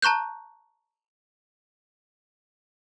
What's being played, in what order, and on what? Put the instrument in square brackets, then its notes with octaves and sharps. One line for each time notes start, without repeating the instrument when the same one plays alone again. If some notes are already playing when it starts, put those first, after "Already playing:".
[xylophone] A5 A#5 C#6 F#6 G6